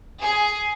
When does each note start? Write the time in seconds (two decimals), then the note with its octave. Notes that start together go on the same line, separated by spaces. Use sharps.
0.19 G#4